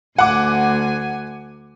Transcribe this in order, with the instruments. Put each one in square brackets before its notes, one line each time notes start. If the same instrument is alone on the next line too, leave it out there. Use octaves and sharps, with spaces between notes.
[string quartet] D2 G#5 [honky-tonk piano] F#5 D6